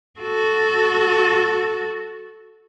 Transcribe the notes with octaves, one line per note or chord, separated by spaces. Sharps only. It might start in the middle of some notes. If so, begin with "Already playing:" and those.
F#4 A4